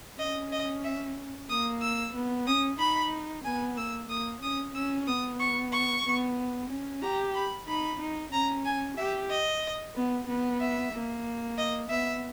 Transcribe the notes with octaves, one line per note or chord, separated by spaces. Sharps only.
C#4 D#5
D#5
E5
A#3 D#6
E6
B3
C#4 D#6
D#4 B5
B3 G#5
A#3 E6
A#3 D#6
C#4 D#6
C#4 E6
B3 D#6
C#6
C#6
B3
C#4
G4 A#5
B5
D#4 B5
D#4
C#4 A#5
G#5
G4 E5
D#5
B3
B3
E5
A#3
D#5
B3 E5